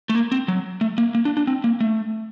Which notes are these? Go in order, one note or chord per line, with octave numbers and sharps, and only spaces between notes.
A3
A#3
C4
F#3
A3
A#3
A#3
D4
D4
C4
A#3
A3